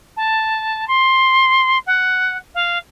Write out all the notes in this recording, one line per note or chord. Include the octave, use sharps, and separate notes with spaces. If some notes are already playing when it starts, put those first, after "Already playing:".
A5
C6
F#5
F5